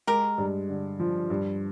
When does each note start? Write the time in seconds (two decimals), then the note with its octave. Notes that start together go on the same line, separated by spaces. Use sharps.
0.07 G#3 G4 A#4
0.38 G2
0.69 D3
0.99 F3
1.30 G2